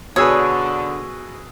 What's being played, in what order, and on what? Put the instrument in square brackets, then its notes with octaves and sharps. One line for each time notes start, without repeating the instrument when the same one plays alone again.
[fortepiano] B2 G#4 B4 [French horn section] D3 [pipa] C#5 [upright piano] D#6 E6